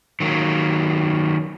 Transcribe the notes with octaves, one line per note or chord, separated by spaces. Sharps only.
D#3 F#3 A#3